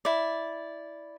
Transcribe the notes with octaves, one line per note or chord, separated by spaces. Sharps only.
E4 D5